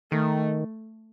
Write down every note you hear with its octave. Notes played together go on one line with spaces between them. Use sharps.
D#3 A3